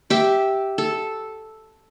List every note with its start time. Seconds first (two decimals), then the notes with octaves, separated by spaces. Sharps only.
0.10 G4 E5
0.78 A4